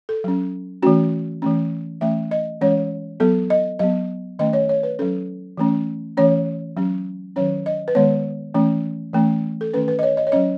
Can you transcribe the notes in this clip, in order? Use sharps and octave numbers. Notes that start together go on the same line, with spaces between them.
A4
F#3 C#4
E3 A3 C#4 F#4
E3 A3 C#4
E3 A3 C#4 E5
D#5
E3 G#3 C#4 C#5
F#3 B3 A4
D#5
F#3 B3 D#5
D#3 A3 C#4 D#5
C#5
C#5
B4
F#3 C#4 A4
E3 A3 C#4
E3 A3 C#4 C#5
F#3 C#4
D#3 F#3 C#4 C#5
D#5
B4
D#3 G#3 B3 C#5
E3 A3 C#4
E3 A3 C#4
A4
D#3 A3 C#4 B4
B4
D#5
C#5
D#5
C#5
F#3 C#4 D#5